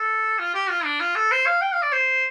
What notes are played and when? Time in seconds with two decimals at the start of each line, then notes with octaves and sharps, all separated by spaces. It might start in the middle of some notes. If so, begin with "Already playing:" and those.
Already playing: A4
0.39 F4
0.54 G4
0.70 F4
0.85 D4
1.00 F4
1.15 A4
1.32 C5
1.46 F5
1.62 G5
1.73 F5
1.82 D5
1.92 C5